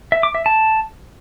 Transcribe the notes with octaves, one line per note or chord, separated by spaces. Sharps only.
E5
D6
E5
A5